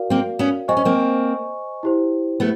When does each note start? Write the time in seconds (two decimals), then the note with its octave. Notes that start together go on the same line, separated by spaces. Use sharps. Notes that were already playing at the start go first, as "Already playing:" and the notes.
Already playing: F#4 A#4 D5 F5
0.10 A#3 C4
0.39 B3 C#4
0.68 C4 C5 D#5 G#5 C#6
0.77 C#4
0.85 A#3 C4
1.83 E4 G4 C5
2.40 A3 B3